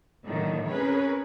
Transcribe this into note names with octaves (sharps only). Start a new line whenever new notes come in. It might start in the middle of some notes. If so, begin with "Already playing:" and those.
A2 D3 D#3 F#3 A3 A#3
C4 C#4 G#4 A#4 B4 C#5